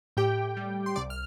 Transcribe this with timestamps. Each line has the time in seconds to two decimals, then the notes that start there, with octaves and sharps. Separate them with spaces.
0.17 A2 G4 G5
0.57 G3
0.86 C6
0.95 C2 D5 D6
1.10 F6